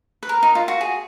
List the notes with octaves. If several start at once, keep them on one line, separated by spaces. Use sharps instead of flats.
B4
A#4
D#4
F4
F#4
G#4